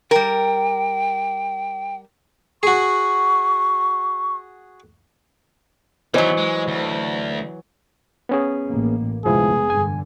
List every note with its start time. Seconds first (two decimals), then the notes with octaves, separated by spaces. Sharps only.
0.11 G3 A#4 G5
2.63 F#4 G#4 C#6
6.14 D#3 E3 F#3 B3 C5 C#5 D#5
6.37 G#3
6.68 D2
8.29 B3 C#4 G#4
8.68 A1 A#3
9.25 F1 D2 F3 G#3 B3 E4 G#4
9.70 G2 D3 G#5